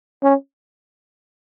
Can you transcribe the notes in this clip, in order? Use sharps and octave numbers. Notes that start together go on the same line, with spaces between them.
C#4